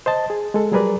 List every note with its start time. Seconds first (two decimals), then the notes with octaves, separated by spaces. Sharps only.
0.06 C5 D#5 A5
0.30 G#4
0.54 G#3 A4
0.72 F#3 G3 G#4 A#4 B4 D5